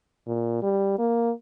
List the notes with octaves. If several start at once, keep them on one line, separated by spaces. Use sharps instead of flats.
A#2
G3
A#3